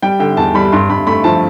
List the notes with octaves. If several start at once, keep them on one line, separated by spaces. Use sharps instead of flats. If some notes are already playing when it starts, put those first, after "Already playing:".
G3 G5
D3 G5
E2 A5
G3 B5
G2 C6
G2 B5
A3 B5
F3 A5